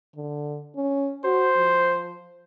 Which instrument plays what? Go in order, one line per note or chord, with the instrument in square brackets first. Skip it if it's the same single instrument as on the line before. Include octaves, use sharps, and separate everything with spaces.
[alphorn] D3
C#4
[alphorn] F#4 [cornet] C5
[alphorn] F3